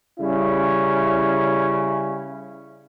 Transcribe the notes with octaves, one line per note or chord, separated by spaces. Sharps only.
C#3 G3 C#4 E4